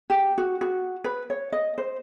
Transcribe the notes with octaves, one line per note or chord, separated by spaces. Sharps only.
G4
F#4
F#4
B4
C#5
D#5
C5